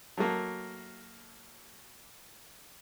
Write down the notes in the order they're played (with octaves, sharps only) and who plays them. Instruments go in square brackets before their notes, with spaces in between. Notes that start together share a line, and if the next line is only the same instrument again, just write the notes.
[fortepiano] F#3 A3 A#3 F#4